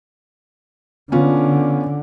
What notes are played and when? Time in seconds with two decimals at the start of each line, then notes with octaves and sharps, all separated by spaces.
1.12 D3 B3 C#4 F4